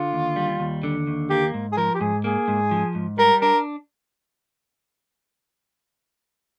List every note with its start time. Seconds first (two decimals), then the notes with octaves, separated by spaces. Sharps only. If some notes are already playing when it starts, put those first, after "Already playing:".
Already playing: D3 F4
0.13 D#2
0.36 G3
0.60 D#2
0.83 D3
1.07 D#2
1.30 A#3 G4
1.54 G#2
1.72 G#4
1.77 F3 A#4
1.95 G4
2.01 G#2 G#4
2.24 A#3 G#4
2.48 G#2
2.71 F3
2.95 G#2
3.18 G3 A#4
3.42 D4 A#4